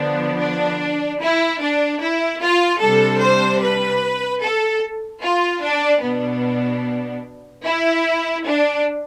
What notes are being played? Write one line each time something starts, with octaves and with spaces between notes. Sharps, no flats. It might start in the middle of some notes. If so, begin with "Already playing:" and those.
Already playing: D3 F3 B3 D4
D4
E4
D4
E4
F4
C3 G3 D4 A4
C5
B4
A4
F4
D4
B2 B3 D4
E4
D4